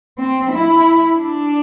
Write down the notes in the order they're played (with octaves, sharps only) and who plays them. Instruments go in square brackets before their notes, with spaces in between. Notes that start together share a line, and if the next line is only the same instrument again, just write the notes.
[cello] C4
E4
D4